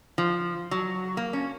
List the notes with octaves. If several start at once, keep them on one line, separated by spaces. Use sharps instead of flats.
F3
F#3
A#3
C#4